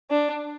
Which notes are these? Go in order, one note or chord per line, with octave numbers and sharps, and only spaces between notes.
D4